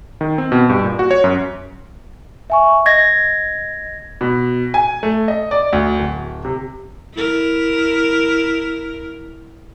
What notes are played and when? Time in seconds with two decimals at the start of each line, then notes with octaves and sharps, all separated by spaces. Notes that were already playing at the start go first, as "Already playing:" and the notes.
0.21 D#3
0.38 C4
0.52 B2
0.69 G2
0.84 A#2
0.99 F#4
1.11 C#5
1.24 F#2
2.50 E5 G#5 C#6
2.86 D#5 G#6 A#6
4.21 B2
4.74 G#5
5.03 A3
5.28 D#5
5.51 D5
5.73 D2
5.99 D1
6.45 C3
7.14 E4 A#4